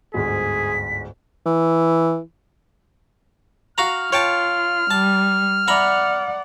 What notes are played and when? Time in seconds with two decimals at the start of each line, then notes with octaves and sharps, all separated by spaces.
0.14 G1 D2 G#2 G#4 B6
1.46 E3
3.78 F#4 F5 A#5 F6
4.13 F4 C#5 G5 A5
4.91 G3 A5
5.68 D5 E5 F#5 A#5 B5